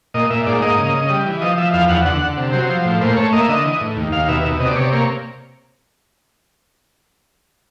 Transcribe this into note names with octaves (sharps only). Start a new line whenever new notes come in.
A#2 D#5
A#2 E5
G#2 D5
A#3 D#5
C#3
C#3
G3
E3
F3 D#5
F3 E5
E2 F5
E2 F#5
D3 F#5
D3
C3
F#3 C5
F3
A2
A#2 C5
A3 C#5
A#3 D#5
E5
D3 D#5
E3
A2
D#2
D#2 F5
B2 E5
B2
C3 D#5
D5
C3 C#5
D5
A#3 C#5